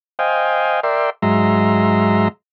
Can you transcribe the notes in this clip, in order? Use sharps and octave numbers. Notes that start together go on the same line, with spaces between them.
C5 D#5 F5 G5 G#5
A#4 D5 E5 G5 C6
G#2 F#3 G#3 E5 A#5 C6